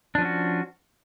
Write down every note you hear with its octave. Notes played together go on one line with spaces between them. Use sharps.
F3 C#4 D4 F#4